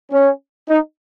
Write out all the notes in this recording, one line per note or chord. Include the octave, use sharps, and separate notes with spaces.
C#4
D#4